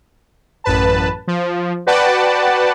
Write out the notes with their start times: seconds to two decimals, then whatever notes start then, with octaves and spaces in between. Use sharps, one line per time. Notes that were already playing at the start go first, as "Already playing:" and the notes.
0.64 A1 F#2 B4 A5
1.28 F3
1.86 F#4 B4 D5 F#5 G5 A5